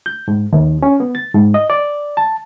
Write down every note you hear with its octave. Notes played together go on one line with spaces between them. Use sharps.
G6
G#2
D#2
C#4
B3
A6
G#2
D#5
D5
A5